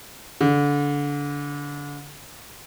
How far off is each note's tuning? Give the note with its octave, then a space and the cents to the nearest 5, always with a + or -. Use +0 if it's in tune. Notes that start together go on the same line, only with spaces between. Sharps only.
D3 -25